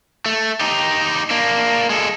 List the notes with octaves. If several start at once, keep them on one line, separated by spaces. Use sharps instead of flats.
A3
D#4 G4
A#3 D4
G#3 A4